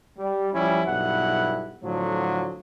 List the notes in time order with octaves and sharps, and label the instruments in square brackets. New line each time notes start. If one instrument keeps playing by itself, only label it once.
[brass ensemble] G3
F3 G3 C#4 E4
B1 G2 E4 F#5
A2 D3 F3 F#3